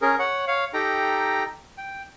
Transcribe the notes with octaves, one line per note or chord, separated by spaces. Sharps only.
C#4 G#4 A#4
C#5 F#5
C#5 F5
D#4 G4 A4 G5 A#5
G5